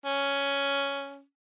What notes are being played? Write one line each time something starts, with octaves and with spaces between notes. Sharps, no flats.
C#4